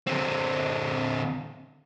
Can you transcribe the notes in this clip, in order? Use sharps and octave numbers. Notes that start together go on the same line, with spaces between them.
D3 C4